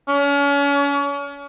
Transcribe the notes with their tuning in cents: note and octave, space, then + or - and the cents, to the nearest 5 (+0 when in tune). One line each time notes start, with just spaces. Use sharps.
C#4 +35